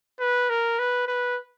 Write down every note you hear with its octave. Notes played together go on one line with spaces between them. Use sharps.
B4
A#4
B4
B4